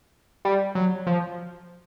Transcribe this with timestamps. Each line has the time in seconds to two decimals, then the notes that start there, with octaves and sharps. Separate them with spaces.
0.45 G3
0.75 F#3
1.07 F3